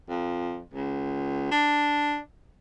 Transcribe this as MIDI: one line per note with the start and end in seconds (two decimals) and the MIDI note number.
0.09 0.62 41
0.73 1.46 37
1.51 2.18 62